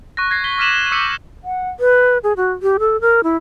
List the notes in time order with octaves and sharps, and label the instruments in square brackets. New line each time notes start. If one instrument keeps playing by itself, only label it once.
[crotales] C#6 F#6 A#6
G#6 A#6 C7
B6 G7
D6 F6 B6 D#7 E7 F#7
D6 E6 G6 B6 C#7
[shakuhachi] F#5
B4
G#4
F#4
G4
A4
A#4
E4